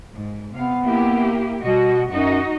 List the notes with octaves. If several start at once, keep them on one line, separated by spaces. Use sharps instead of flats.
G#2
C3 B3 F5
A#3 E4 G4
B2 G3 F#4 D#5
F#2 D#4 F#4 D#5